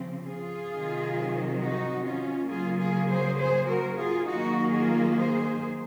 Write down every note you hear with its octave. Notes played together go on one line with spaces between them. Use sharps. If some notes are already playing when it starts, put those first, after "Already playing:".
Already playing: C#3 F3 C4
F4 G#4
C3 D#3 F#3 C4
D#4 F#4
C#4 F4
C#3 F#3 A#3 F4 G#4
F4 G#4
G#4 C5
G#4 C5
F#4 A#4
F4 G#4
D#3 F#3 A#3 D#4 F#4
F4 G#4
G#4 C5